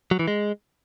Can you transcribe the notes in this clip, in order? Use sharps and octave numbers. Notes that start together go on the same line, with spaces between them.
F#3
E3
G#3